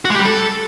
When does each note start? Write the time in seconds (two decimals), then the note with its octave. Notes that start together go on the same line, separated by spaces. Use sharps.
0.05 F#4
0.10 G#3
0.15 G4
0.20 G3
0.25 A4